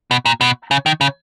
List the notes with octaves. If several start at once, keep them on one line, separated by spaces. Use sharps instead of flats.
B2
A#2
B2
C#3
D#3
C#3